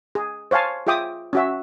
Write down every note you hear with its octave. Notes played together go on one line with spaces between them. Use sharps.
G#4
C5 C#5 F5 G#5 A5
F4 G#4 E5 G5 D6 D#6
C#4 F#4 E5